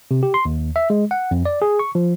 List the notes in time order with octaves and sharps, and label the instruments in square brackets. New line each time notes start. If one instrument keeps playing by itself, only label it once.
[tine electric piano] C3
G4
C6
D#2
E5
G#3
F#5
F2
D5
G#4
C#6
F3